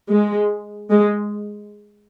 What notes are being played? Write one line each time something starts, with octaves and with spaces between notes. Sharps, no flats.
G#3
G#3